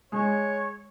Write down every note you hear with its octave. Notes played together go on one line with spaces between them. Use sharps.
G#3 C#5